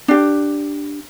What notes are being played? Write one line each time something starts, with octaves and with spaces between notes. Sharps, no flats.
D4 G4